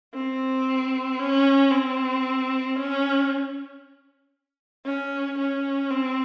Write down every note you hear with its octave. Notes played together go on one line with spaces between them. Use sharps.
C4
C#4
C4
C#4
C#4
C#4
C4